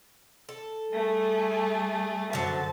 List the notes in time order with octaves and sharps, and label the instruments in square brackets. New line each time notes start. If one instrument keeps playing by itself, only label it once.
[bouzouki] A4
[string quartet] G3 A3 G#4
[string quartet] F#2 C5 A5 [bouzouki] D3 F#3